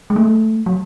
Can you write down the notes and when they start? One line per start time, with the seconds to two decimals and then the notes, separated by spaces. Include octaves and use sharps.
0.10 G#3
0.16 A3
0.66 F#3